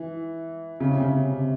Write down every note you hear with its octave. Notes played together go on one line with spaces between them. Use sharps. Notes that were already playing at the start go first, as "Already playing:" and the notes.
Already playing: E3
C#3
C3
C#3
C3